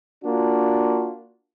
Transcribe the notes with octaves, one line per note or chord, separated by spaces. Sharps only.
A#3 D4 F4 F#4